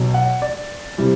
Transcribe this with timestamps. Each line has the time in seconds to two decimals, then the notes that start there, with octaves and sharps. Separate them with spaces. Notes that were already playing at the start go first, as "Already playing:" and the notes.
Already playing: B1 B2 F#3
0.14 F#5
0.42 D5
0.98 C3 E3 G3